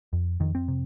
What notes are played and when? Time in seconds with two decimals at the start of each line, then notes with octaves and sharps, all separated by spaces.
0.13 F2
0.40 F2 D#3
0.55 C4
0.68 C3